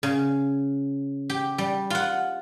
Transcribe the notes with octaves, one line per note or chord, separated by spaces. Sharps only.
C#3
G4
G3
F4 F#5